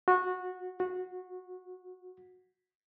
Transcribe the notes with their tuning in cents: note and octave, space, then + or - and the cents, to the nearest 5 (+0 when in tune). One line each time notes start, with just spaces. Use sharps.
F#4 -20
F#4 -20